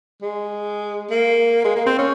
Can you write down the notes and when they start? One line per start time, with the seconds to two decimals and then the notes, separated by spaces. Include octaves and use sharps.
0.22 G#3
1.11 A#3
1.65 G#3
1.76 A#3
1.87 C4
1.98 C#4